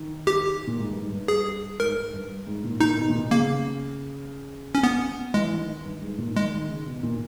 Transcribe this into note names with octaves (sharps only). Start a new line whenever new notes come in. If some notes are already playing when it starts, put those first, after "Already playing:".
Already playing: D#3
G4
A#2
G#2
G2
G#2
G2
G#4
G#2 A#4
G#2
G2
G#2
A#2
A#2 D#4
B2
A#2
B2
C#3 A#3
C#4
B3
E3 G#3
D#3
G2
G#2
A#2
D#3 G#3
D#3
C#3
B2
A#2